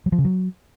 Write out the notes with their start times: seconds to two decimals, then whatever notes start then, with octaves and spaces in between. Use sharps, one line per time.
0.06 F#3
0.12 F3
0.18 C#3
0.25 F#3